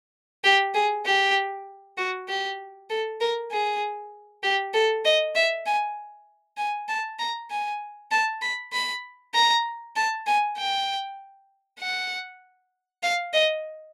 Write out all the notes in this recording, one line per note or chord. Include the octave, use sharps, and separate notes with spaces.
G4
G#4
G4
F#4
G4
A4
A#4
G#4
G4
A4
D#5
E5
G#5
G#5
A5
A#5
G#5
A5
B5
B5
A#5
A5
G#5
G5
F#5
F5
D#5